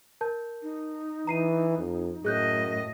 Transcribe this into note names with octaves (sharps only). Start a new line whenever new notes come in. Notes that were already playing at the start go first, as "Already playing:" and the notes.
A#4 A5 G6
D#4
E3 A#5 C7 D#7
F2
F#2 A2 G#4 D#5 F#6 G6